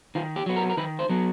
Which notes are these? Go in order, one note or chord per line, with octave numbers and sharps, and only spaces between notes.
D#3 F4
G4
F#3 B3
A#4
A#4
D#3 B4
C5
F#3 B3